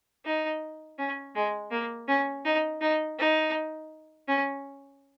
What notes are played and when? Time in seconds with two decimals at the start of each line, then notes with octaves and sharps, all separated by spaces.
0.25 D#4
0.99 C#4
1.35 G#3
1.71 A#3
2.08 C#4
2.45 D#4
2.81 D#4
3.19 D#4
4.28 C#4